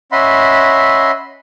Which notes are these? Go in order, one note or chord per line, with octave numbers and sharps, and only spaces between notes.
C#4 D#5 E5 F#5 B5 C6